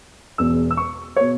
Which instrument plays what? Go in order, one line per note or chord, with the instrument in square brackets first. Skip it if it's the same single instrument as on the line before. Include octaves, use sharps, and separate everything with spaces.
[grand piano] E1 E2 B2 E6
E6
C#6
B2 C#5